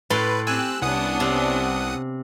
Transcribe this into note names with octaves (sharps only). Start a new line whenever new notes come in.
A2 A4 B4 C6
C4 G4 G#5 E6 F#6
C2 B3 C#4 D4 F#5 D#6
C3